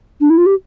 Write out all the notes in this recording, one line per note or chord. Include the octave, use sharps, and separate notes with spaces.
D4
E4
F4
G4